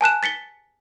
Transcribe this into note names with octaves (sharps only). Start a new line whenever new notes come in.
G#5 A5 F#6 E7
A6 B6 C#7 G7